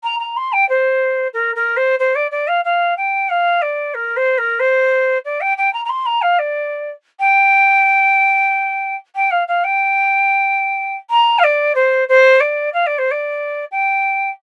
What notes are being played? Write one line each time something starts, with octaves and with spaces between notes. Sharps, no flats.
A#5
A#5
C6
G5
C5
A#4
A#4
C5
C5
D5
D5
F5
F5
G5
F5
D5
A#4
C5
A#4
C5
D5
G5
G5
A#5
A#5
C6
A#5
F5
D5
G5
G5
F5
F5
G5
A#5
F5
D5
C5
C5
D5
F5
D5
C5
D5
G5